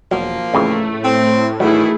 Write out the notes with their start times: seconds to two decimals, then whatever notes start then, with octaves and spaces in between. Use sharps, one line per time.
0.11 E1 F3 F#3 A#3
0.54 F2 A2 C#3 E3 A3
1.04 C4
1.60 D#3 E3 F#3 A3 E4 G#4